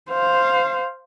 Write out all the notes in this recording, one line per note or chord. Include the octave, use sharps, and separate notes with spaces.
C5 F5